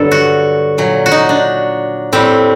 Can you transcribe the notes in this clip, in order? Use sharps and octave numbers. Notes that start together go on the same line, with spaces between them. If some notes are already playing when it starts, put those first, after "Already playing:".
Already playing: G2 D3 F#3 A4
F#4
A#2 F#3
F#4
D#4
D4
A2 G3 C4